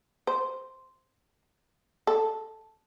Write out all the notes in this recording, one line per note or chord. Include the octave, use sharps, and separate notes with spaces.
C5
A4